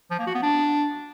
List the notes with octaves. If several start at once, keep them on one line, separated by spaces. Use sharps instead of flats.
F3
A#3
F#4
B3
D4